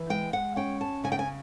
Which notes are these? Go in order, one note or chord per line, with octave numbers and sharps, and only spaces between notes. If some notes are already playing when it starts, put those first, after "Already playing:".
Already playing: E3
G#3 G5
F#5
C#4 G5
A5
C#3 G#5
G5
G#5